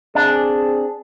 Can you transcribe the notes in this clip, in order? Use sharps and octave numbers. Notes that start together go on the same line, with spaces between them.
C4 D4 G#4